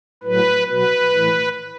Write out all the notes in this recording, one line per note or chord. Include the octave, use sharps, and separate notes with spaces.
A2 F#3 B4
B2 F#3 B4
A2 E3